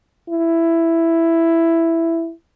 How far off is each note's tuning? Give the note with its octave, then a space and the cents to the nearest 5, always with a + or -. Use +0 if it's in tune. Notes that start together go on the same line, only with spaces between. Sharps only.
E4 +5